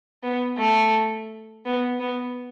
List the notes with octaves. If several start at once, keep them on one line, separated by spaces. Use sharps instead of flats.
B3
A3
B3
B3